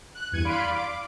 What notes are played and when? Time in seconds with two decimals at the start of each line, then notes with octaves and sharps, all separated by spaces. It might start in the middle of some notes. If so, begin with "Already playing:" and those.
0.15 F#6
0.32 E2 G2 E3 G#6 C#7 D#7
0.45 D5 F5 B5 C6 D7
0.71 D6 D7
0.84 D6